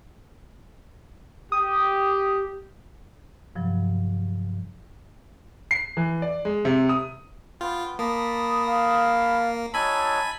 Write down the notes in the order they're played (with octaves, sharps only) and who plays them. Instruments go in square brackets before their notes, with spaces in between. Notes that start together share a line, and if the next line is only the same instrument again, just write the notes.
[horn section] G4 [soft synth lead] D#6
[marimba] G2 C3 F3 F#3
[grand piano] C7
E3
D5
G#3
C3
D#6
[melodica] B3 G5 [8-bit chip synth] F4
[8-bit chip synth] A#3 [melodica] A5 B5 [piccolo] D#6
[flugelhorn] F5
[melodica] F#3 D#4 C#5 [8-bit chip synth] G#5 B5 [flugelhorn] A5 [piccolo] E6